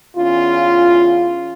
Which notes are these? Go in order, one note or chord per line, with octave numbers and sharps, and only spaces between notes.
E2 C#4 F4